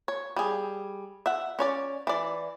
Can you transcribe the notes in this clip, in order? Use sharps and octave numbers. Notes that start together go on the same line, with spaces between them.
C#5
G3 G#4
E5 F#5
C#4 C#5 D5
E3 D5